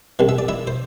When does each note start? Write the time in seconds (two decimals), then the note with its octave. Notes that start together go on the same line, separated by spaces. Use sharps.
0.19 C2 C3 E3
0.29 E5
0.38 D5
0.48 E4 E5
0.67 C5